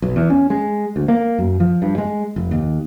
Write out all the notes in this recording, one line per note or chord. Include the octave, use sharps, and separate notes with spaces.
B1
E2
C#4
G#3
D2
A#3
F#2
F3
G2
G#3
F1
D#2